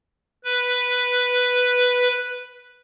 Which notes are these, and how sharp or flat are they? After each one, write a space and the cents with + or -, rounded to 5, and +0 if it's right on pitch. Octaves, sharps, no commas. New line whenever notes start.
B4 +0